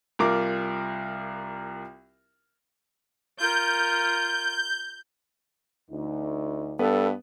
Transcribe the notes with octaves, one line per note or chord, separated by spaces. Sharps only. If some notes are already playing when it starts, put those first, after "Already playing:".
C2 F4 A#4 D6
F4 A#4 G6
D2 D#4
G2 B3 A4 B4